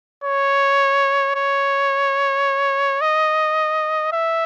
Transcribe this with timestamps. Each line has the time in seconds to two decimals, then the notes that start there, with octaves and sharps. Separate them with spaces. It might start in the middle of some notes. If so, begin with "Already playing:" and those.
0.24 C#5
1.36 C#5
3.01 D#5
4.13 E5